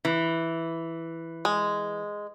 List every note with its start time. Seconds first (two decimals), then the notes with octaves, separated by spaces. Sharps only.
0.05 E3
1.45 G#3